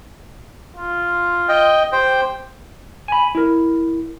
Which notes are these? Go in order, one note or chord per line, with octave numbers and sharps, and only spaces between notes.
F4
D#5 G5
G4 C5 G5
G#5 B5
E4 A#4